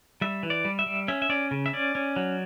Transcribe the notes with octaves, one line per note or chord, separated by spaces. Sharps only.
G3 E5
E3
D5
G3
E5
G3
C#4 E5
E5
C#4 D5
C#3
E5
C#4 D5
C#4
F#3